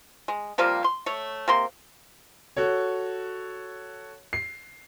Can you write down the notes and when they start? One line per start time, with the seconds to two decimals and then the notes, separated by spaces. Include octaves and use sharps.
0.28 G#3
0.58 C3 F3 G3 A#3
0.84 C6
1.06 A3 C#5
1.48 C3 A#3 C6
2.57 F#4 A4 C#5
4.33 C7